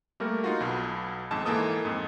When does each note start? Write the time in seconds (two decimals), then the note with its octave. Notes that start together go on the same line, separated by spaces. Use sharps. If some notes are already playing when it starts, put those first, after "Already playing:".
0.20 G3 A3 A#3 A#4
0.44 D#4 F4 F#4
0.60 B1 B2
1.31 G#1 F2 G#2 A5 E7
1.46 G#2 E3 A#3 A4 D#6
1.85 F2 G#2